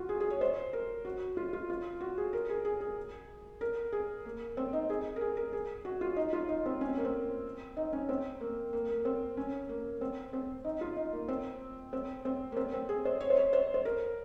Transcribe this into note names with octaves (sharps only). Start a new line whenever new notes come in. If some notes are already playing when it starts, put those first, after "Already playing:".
Already playing: F4 F#4
G#4
G#4
C#5
C5
A#4
F#4
F4
F4
F4
F#4
G#4
A#4
G#4
G#4
G#4
A#4
G#4
A#3
C4
D#4
G#4
A#4
G#4
A#4
G#4
F#4
F4
D#4
F4
D#4
C4
C#4
C4
A#3
C4
D#4
C#4
C4
A#3
A#3
A#3
C4
C#4
A#3
C4
C4
D#4
F4
D#4
A#3
C4
C4
C4
A#3
C4
C4
G#4
C5
C#5
C5
C#5
C5
C5
A#4